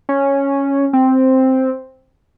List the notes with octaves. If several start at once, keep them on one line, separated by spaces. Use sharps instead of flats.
C#4
C4